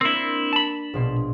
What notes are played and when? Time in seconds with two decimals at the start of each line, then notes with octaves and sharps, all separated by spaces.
0.01 A#3 C4 D4 E4
0.53 A5 B5
0.94 A#1 B2 C6